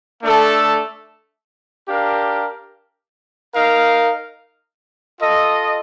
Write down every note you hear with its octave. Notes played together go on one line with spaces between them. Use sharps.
A3 D4 A4
D4 G4 A#4 F5
D#4 A#4 F5
F4 A4 D#5